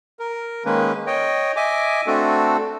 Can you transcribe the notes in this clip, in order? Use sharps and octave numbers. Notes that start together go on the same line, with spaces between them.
A#4
D#3 G#3 A#3 C#4 B4
C#5 D#5 G5
D#5 E5 G#5 D6
A3 C4 D4 F#4 A4